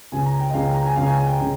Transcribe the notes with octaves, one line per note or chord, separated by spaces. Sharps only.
C#2 C#3 G#5
A#5
G5
D#5
C#2 C#3 F5
G5
A#5
G#5
C#2 C#3 F5
G#5
G#5
G5
C#3